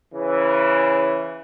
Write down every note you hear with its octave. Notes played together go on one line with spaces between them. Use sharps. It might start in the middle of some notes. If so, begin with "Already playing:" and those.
C#3 E3